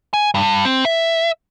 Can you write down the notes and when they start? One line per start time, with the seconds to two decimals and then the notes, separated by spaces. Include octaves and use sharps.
0.14 G#5
0.34 G2
0.65 C4
0.85 E5